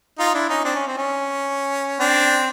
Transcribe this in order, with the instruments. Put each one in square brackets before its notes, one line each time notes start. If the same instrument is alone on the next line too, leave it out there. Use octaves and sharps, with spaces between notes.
[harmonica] D#4 F4
D4 E4
C#4 D#4
C4 D4
C#4
C4
C#4
C4 D4